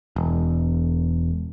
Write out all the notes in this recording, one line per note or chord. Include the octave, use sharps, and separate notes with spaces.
E1